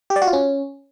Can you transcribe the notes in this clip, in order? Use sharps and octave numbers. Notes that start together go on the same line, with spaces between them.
G4
D5
F#4
F4
C#4